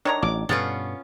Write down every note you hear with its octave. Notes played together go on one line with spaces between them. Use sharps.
D#3 D4 F4 C#5 A#5
A1 D6
G2 B2 B3 C#4 F4 A4 F5